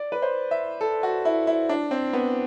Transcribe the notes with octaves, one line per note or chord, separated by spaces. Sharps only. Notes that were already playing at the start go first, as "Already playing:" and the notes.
Already playing: D5
B4
C5
E5
A4
F#4
E4
E4
D4
C4
B3